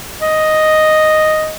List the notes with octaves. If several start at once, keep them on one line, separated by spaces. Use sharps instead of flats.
D#5